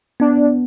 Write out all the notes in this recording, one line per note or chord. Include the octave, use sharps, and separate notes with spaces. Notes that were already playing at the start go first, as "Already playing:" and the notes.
B3 D4